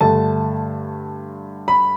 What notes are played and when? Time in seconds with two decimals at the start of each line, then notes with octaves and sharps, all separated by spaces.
0.01 G2 D3 A3 A5
1.68 B5